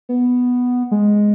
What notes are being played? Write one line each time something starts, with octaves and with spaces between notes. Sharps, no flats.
B3
G#3